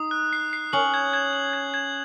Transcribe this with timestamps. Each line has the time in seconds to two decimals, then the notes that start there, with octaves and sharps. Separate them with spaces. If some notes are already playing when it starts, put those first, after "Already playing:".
Already playing: D#4 D#6
0.11 F#6
0.33 C7
0.53 C7
0.73 C#4 F#7
0.94 G#6
1.13 G#6
1.33 F#7
1.53 G#6
1.74 G#6